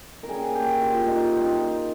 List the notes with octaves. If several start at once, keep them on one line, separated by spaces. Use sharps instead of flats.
A#4
C#3 G3 A#3 G#4
G4
F4
F4
D#4
D#4
F4